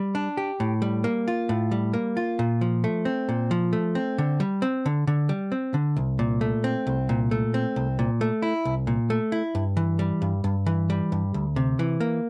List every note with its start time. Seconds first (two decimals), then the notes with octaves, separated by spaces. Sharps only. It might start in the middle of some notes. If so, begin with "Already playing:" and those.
Already playing: G3
0.15 D4
0.37 G4
0.60 A2
0.82 G3
1.04 A#3
1.28 F4
1.49 A2
1.71 G3
1.93 A#3
2.17 F4
2.39 A#2
2.61 F3
2.84 A3
3.05 C4
3.29 A#2
3.51 F3
3.73 A3
3.95 C4
4.18 D3
4.40 G3
4.62 C4
4.86 D3
5.07 D3
5.29 G3
5.52 C4
5.74 D3
5.97 C2
6.19 A#2
6.41 A3
6.64 C4
6.87 C2
7.09 A#2
7.31 A3
7.54 C4
7.76 C2
7.99 A#2
8.21 A3
8.42 E4
8.65 C2
8.87 A#2
9.10 A3
9.32 E4
9.55 G2
9.77 E3
9.99 G3
10.22 G2
10.44 G2
10.66 E3
10.90 G3
11.12 G2
11.34 D2
11.56 C3
11.79 E3
12.00 A#3